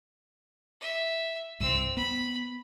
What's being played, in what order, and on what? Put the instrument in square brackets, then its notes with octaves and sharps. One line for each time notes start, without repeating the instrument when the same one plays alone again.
[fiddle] E5
[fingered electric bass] C2 G2 [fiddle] C4 E6
[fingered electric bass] B3 [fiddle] B5